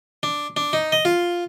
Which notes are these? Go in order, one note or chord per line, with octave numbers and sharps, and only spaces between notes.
D4
D4
D#4
D#5
F4